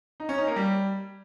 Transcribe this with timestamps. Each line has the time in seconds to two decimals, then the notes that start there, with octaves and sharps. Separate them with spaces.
0.20 D#4
0.29 C#4
0.38 D#4
0.47 A#3
0.56 G3